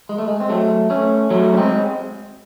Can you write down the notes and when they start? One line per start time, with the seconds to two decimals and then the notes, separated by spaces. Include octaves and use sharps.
0.09 G#3
0.18 A3
0.28 G#3
0.40 C4
0.50 F#3 A3
0.90 A3 C#4
1.30 F#3 A3
1.53 C#4
1.57 G#3 C4